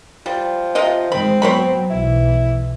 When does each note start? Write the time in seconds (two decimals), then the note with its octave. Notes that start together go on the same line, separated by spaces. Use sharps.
0.26 F3 G3
0.75 C3 F4 D#5
1.12 G#2 D#3 G#3 C4 B5
1.42 F#3 B3 C5 C#5 B5
1.90 B1 E3 E4